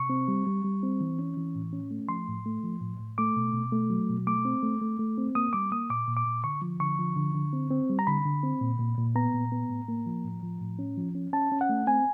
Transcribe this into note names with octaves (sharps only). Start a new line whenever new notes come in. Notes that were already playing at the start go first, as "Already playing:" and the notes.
Already playing: C3 C#6
C4
G3
G3
G3
C4
E3
C#4
E3
A2
C#4
A3
F3 C6
A2
A3
F3
A2
A2
A3 D6
B2
B2
A3
F#3
B2
A3 D6
C4
A3
A3
A3
C4
A#3 D#6
G3 D6
A#3 D#6
A#2 D6
A#2
D6
A#2
D3 C#6
F3
D3 C#6
F3
D3
D3
C4
C4
G3
A#5
D3 B5
D3
C4
A#2
A#2
A#2
B3 A#5
A#2
B3
A2
A#3
F3
A2
F3
A2
C#4
F3
C#4
C#4 A5
C#4
F#5
A3
C4 G#5